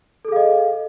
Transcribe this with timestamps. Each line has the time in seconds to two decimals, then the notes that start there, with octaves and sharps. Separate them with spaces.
0.25 A4
0.28 G#4
0.32 F5
0.36 D#5